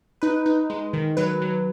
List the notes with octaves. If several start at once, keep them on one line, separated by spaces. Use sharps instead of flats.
D#4 B4
D#4
G#3
D#3
F#3 B4
F#3